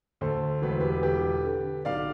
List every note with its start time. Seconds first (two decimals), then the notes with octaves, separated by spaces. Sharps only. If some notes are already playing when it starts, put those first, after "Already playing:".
0.21 D2 A4 C5
0.62 E1 B4
0.72 C5
0.80 G4 B4
1.03 D3 G4 B4
1.44 D3
1.85 B1 D5 F5